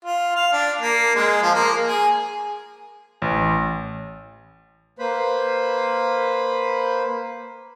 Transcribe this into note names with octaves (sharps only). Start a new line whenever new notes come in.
F4
F5
D4
A#3
G#3
F3
A#3
G#4
A1
A#3 B4 C5 B5